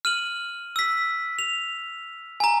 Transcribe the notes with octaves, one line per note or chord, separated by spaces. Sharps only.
F6 D#7 F#7
E6 B6
F7
G#5 A#5